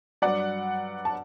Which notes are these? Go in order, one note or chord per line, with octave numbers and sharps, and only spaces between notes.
G2 F#3 D5 F#5
A5